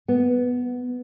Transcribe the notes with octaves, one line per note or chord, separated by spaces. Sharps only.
B3